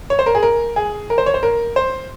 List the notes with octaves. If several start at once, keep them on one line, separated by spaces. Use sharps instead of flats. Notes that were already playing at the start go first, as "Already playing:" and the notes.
C#5
C5
A#4
G#4
A#4
G#4
A#4
C5
C#5
C5
A#4
C5